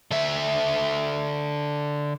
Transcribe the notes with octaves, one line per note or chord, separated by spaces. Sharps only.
D3 E5